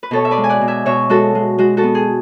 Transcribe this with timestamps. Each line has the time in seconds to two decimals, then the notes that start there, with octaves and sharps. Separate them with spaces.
0.03 B4
0.11 B2 A4 C#5
0.25 E5
0.31 B4 D5
0.38 G#3
0.44 G#5
0.49 D5 F#5
0.61 B2
0.68 E5 G#5
0.86 B2 C#5 E5
1.10 G#3 F#4 A4
1.35 G#3
1.58 G#3 F#4
1.77 F#4 A4
1.83 B3
1.95 G#4